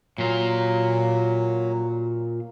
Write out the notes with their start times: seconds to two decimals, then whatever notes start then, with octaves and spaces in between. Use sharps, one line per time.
0.18 A#2 F#3 F4